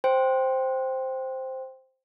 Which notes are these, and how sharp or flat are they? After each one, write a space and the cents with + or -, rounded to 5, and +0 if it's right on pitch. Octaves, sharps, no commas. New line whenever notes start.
C5 +0 G5 +0